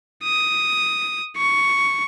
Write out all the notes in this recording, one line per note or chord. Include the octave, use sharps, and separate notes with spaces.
D#6
C#6